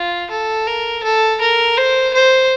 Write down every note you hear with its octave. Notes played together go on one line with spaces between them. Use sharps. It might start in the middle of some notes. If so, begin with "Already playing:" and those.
Already playing: F4
A4
A#4
A4
A#4
C5
C5